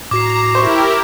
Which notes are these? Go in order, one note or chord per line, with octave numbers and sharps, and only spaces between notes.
A2 F#4 A#5 D6 C7
E4 G4 A#4 C5 C#6